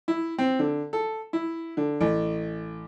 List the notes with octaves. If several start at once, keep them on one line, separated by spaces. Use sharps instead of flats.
E4
C4
D3
A4
E4
D3
A1